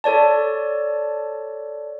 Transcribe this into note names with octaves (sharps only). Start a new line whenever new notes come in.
A4 C#5 D5 A5